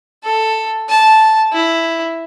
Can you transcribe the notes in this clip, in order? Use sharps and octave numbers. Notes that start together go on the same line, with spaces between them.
A4
A5
E4